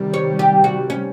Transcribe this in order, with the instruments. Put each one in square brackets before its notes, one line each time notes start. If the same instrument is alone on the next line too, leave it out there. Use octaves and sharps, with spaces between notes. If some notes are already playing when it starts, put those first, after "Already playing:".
Already playing: [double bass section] C3 D#3 G3
[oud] C#5
G4
F#4
C#4